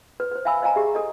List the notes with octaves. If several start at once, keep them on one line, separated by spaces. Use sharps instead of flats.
B4
B4 C5
E5 F5 G#5 B5 E6
C5 D#5 F5 G#5 A#5
G4 G#4 E5
A4 D#5